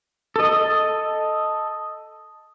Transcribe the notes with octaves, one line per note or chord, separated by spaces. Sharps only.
A4 D#5